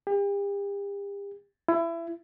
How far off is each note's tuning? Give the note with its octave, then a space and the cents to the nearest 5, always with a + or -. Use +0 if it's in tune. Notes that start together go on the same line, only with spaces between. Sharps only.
G4 +40
E4 +25